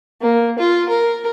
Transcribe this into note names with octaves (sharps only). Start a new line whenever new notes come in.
A#3
F4
A#4